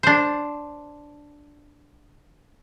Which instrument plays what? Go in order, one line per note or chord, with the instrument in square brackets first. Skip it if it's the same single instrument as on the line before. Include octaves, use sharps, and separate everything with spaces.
[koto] D4 C5